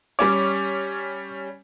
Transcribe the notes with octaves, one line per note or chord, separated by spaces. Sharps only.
G3 C#4 C#5 D6